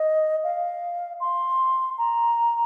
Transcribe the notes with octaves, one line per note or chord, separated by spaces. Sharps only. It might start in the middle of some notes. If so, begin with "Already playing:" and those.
Already playing: D#5
F5
C6
A#5